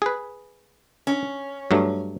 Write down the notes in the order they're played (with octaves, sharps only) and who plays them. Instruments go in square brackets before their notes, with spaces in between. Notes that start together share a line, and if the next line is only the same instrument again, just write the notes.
[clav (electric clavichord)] G#4 B4
[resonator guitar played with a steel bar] C#4
[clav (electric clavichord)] G2 F#3 A3